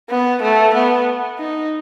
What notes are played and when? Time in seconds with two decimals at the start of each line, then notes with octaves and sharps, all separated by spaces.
0.10 B3
0.42 A3
0.74 B3
1.39 D#4